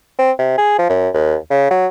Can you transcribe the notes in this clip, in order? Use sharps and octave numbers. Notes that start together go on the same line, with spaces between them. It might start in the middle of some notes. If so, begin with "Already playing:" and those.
C4
C3
G#4
F3
F#2
D#2
C#3
F#3